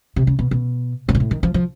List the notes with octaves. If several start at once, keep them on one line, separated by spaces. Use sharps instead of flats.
C3
C#3
B2
B2
A2
A#2
A2
D#3
F3
F3